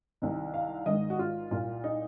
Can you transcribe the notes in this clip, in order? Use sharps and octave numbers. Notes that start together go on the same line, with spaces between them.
C2 C3 D#3
F5
G#1 G#2 D#3 D#5
F#4
F4
C2 A#2 F4
D#4